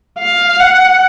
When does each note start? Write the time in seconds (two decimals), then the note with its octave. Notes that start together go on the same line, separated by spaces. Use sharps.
0.19 F5
0.60 F#5